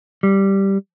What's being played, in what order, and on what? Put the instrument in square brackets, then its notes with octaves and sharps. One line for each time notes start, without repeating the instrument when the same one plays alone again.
[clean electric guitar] G3